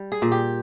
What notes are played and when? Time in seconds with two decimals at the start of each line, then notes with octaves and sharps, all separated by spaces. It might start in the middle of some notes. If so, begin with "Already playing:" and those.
Already playing: G3
0.12 G#4
0.22 A#2
0.32 G4